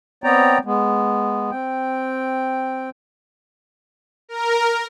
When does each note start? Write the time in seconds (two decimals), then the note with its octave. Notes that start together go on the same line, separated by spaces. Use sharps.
0.24 B3 C4 C#5 D5 G5 A#5
0.65 G#3 B3
1.51 C4 G5
4.29 A#4